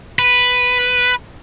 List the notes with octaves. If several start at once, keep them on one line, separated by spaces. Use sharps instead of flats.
B4